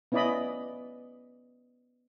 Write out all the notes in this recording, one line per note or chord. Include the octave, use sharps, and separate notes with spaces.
B3 C#4 E4 D5 D#5 B5